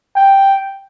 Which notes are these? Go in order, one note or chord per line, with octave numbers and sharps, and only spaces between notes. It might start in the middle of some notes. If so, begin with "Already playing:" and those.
G5